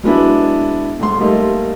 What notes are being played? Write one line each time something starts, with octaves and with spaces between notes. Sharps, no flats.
F#3 G#3 B3 D4 E4
D#1 G#2 C6
G3 A3 A#3 D#4